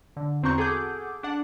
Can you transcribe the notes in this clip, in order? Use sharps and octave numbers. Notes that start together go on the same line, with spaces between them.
D3
E2 C4 F#4 A#5 C#6 G6
G#4 A4 F#5 D6 G6
D4 F#5